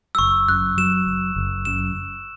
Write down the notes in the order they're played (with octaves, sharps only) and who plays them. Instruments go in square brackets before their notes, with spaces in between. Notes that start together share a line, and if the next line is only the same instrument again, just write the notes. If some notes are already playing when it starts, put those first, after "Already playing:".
[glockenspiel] E6
[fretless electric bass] F#1 [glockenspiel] C#6
[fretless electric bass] F#2 [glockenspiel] F#6
[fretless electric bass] F#3 [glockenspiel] E7
[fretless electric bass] F#1
F#1
[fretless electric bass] F#2 [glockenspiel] E7